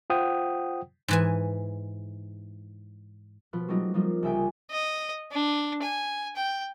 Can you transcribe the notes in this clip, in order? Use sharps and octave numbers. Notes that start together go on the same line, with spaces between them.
F4 C5 F#5 G5 D#6
G#2 E3 G#5
B2 F3 F4 B4
F#3 G3 A3 C4 D#4 F4
F3 G3 A#3 D#4 F4
C2 C#3 E5 G5 G#5
D#5
D4
G#5
G5